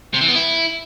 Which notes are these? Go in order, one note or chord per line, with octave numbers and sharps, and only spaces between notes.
C3
E3
B3
E4